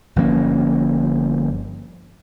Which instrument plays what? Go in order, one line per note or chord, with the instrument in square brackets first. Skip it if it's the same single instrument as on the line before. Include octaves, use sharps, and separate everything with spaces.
[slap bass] G1 F3 A#3 C#4